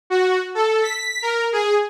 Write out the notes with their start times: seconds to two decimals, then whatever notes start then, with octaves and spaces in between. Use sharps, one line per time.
0.10 F#4
0.55 A4
0.83 B6
1.22 A#4
1.52 G#4